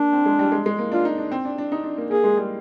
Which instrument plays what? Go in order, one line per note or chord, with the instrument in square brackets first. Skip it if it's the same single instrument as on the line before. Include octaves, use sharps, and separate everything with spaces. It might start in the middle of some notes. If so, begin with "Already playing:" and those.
Already playing: [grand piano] A#3 [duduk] D4
[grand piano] C4
G#3
G3
G#3
G#3
A#3
[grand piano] D4 [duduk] F4
[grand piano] D#4
D4
C4
D4
D4
D#4
D4
A#3
[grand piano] A#3 [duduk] G#4
[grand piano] G#3
G3